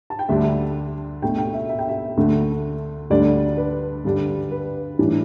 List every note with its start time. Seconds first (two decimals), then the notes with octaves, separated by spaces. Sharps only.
0.10 A5
0.19 G5
0.29 D2 D3 G3 D4 E5
1.22 B2 A3 D4 G5
1.38 G5
1.53 E5
1.69 E5
1.79 G5
1.89 E5
2.17 D2 D3 A3
3.10 D2 D3 G3 D4 D5
3.57 B4
4.04 G2 D3 G3 D4
4.52 B4
4.99 A2 E3 G3 D4